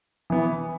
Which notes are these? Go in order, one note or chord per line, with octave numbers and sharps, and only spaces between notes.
E3 B3